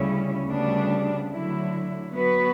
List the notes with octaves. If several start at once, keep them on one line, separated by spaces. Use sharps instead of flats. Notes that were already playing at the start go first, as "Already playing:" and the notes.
Already playing: D2 C#3 G3 C#4 E4
D2 C#3 G3 B3 D4
D3 F#3 A3 E4
F#3 B3 F#4 B4